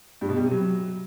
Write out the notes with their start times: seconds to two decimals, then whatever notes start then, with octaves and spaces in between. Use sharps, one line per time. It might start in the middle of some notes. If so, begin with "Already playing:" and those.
0.21 G2
0.29 B2
0.36 G3
0.44 C3
0.51 F#3